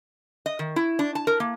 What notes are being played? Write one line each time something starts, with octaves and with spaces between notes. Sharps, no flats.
D#5
D#3
E4
D4
A5
A#4
A#3